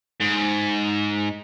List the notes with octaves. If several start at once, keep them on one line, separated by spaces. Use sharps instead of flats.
G#2